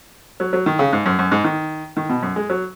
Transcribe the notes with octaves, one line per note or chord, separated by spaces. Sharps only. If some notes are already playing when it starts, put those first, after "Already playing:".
F#3
F#3
D#3
C#3
G#2
F#2
F#2
G#2
D#3
D#3
B2
F#2
G#3
F#3